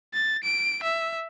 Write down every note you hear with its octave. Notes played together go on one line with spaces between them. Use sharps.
A6
D7
E5